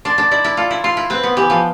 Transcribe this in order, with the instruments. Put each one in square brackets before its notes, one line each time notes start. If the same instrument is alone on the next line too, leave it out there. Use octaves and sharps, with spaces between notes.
[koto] D4 [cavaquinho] C6
[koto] D4
[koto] E4 [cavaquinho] D5
[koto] E4
[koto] F4 [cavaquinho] A4
[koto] E4
[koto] F4 [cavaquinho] C6
[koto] E4
[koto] C4 [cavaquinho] B4
[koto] B3
[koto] E3 [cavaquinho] G4
[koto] F3